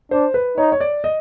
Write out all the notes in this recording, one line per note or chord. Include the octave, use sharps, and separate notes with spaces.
D4 C5
B4
D#4 C#5
C#5
D5
D#5